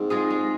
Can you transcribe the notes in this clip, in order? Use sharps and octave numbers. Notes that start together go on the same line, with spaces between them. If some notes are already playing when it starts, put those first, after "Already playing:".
Already playing: G#2 A#3 C4
G#3 F4 G#4
G#3